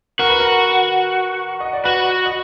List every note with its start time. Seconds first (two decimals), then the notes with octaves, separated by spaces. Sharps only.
0.19 F#4 A#4
0.29 B4
0.40 A#4
1.60 D#5
1.73 D5
1.84 F#4 B4
2.26 D#5